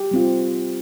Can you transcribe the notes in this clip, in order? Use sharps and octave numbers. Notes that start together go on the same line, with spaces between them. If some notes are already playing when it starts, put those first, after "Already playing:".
Already playing: G4
G3 C4 F4